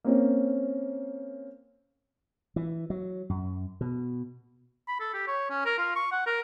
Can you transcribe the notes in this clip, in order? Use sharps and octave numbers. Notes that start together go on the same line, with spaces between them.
A#3 C4 C#4
E3
F#3
F#2
B2
B5
A4
G4
C#5
C#4
A#4
F4
C#6
F#5
A#4